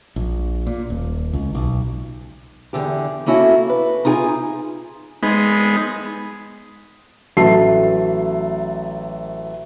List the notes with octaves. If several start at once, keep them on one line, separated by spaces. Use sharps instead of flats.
A#1
A#2
D#1
C#2
B1
E2 D3 G4
A#3 C#4 E4 F#4 G4 A4
B4
D#4 F4 G#4 G5 G#5
G#3 B3 D#4
A1 F#3 A4 E5 A5 C7